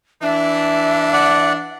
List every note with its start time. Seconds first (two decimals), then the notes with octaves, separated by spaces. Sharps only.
0.23 E3 D4 E5
1.13 D5 F#5